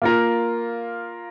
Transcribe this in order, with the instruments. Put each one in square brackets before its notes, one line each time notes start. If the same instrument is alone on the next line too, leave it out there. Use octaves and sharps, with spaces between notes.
[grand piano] A#3 F4 A#4